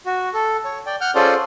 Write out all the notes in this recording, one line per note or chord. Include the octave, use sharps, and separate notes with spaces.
F#4
A4
C#5
D5 G5
F#5 F6 G6
C#4 F4 G#4 A4 C5 D5